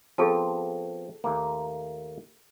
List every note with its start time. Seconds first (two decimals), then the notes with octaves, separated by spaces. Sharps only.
0.18 F3 B3 C4 G#4 A4 A5
1.24 D#2 A3 A#3